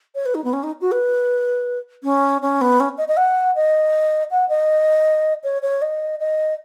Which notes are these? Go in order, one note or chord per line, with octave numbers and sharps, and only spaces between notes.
C#5
B4
D#4
B3
C#4
D#4
F#4
B4
C#4
C#4
B3
C#4
D#5
D#5
F#5
D#5
F#5
D#5
C#5
C#5
D#5
D#5